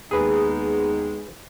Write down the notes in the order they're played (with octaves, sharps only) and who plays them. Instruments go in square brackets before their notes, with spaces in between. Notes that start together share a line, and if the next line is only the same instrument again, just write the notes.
[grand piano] D#2 [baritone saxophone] G#3 [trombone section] B3 D#4 [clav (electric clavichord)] G#4 B4